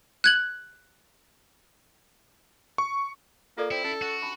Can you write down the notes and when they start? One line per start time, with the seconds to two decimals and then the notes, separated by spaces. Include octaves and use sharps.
0.24 F#6 G#6 F#7
2.78 C#6
3.57 A#3 F4 A4 D5
3.71 C4 E4
3.84 C#4 A4
4.02 F#4
4.22 D4 A5 B5